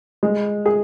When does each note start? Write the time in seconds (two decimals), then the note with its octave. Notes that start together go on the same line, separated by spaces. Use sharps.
0.23 G#3
0.66 G#4